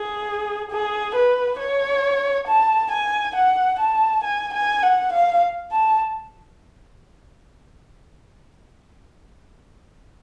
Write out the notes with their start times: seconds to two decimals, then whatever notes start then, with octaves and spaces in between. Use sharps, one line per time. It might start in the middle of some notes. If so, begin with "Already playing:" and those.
Already playing: G#4
0.71 G#4
1.15 B4
1.59 C#5
2.48 A5
2.91 G#5
3.36 F#5
3.80 A5
4.24 G#5
4.54 G#5
4.83 F#5
5.13 F5
5.72 A5